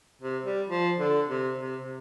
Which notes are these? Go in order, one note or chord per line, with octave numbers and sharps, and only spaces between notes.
C3
G3
F3
D3
C3
C3
C3